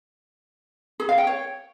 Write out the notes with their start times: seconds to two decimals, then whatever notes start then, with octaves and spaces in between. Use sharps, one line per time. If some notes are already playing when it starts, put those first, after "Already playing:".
1.00 G#4
1.09 F5
1.18 G5
1.27 C#5